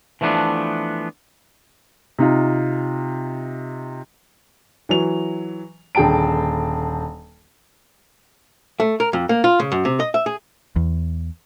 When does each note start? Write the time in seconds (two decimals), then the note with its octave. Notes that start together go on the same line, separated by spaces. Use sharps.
0.21 E3 F3 A3 B3 D4
2.19 C3 D#4 F4
4.89 E3 F#3 F7
5.95 D#1 D3 G#4 G5 A5 D7
8.80 A3
9.00 A#4
9.13 F2
9.29 A#3
9.44 F4
9.60 C#3
9.72 F#2
9.85 C3
10.00 D#5
10.14 E5
10.26 G#4
10.76 E2